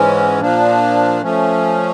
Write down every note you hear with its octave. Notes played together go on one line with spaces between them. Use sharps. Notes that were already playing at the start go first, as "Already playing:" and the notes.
Already playing: G#2 E3 G#3 C#4
A#2 F3 A#3 D4
F3 A3 C#4